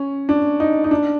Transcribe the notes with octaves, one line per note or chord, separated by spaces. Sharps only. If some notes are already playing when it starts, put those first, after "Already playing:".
Already playing: C#4
D4
D#4
D#4
D4